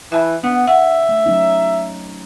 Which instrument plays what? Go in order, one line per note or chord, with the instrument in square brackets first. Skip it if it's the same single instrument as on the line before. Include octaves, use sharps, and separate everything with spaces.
[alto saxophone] E3 [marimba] E5 A5 B5
[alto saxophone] B3 [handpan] D4 [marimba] F#5
[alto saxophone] E5 [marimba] F#5
[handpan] A3
F#3 C#4 D#4